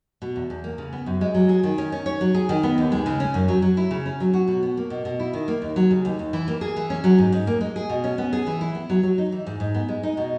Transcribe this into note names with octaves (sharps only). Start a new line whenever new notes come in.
B2
E2
E2
A#3
C#3
B3
F#2
G#3
F#3
G#4
D#3
C#4
C#4
C#5
F#3
G#4
D#3
B3
D#2
G#3
C#3
C#4
F#2
F#3
F#3
E4
C#3
C#4
F#3
F#4
B2
B3
A#3
B2
B2
E4
D#3
A#3
D#2
F#3
C#3
D#2
D#2
E3
A#3
G#4
E3
C#4
F#3
G#2
G#2
A#3
G#3
G#4
B2
C#4
B3
G#4
E3
E4
B3
F#3
F#3
D#4
E3
G#2
G#2
B3
G#3
D#4
B2